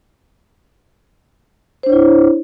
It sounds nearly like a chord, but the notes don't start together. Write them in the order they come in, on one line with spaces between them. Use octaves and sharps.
C5 D4 C#5 E4